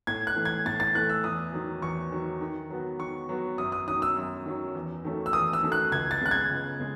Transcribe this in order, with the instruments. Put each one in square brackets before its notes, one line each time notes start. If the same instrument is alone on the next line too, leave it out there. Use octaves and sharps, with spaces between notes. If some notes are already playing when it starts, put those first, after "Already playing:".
[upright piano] A2 [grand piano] G#6
[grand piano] F#6
[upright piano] E3 A3
[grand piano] G#6
[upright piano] A2 [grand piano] A6
[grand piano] A6
[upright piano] E3 A3 [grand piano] F#6
[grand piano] E6
[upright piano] E2 [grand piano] D#6
[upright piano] D#3 F#3
[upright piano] E2 [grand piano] C#6
[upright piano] D#3 F#3
D#3
F#3 B3 F#4
[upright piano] D#3 [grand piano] C#6
[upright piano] F#3 B3 F#4
[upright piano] F#2 [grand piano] D#6
[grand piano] D#6
[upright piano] D#3 F#3 C#4 [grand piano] D#6
[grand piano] E6
[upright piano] F#2
D#3 F#3 C#4
E2
D#3 F#3 A3 C#4
[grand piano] E6
[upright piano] E2 [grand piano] D#6
[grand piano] E6
[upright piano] D#3 F#3 A3 C#4
[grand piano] F#6
[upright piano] C#2 [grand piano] G#6
[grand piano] A6
[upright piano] C#3 G#3 B3 [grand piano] F#6
[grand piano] G#6
[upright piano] C#2
C#3 G#3